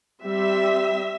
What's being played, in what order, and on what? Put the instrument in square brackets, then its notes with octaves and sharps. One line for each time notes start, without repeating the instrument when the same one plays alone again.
[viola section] G3 C4 E5